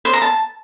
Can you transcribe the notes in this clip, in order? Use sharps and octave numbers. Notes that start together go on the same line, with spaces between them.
C5
A#5
A5